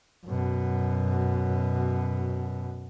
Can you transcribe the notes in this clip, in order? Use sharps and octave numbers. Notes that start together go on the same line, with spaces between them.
F#2 B2